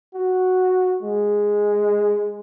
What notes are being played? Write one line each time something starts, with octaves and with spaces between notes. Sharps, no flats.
F#4
G#3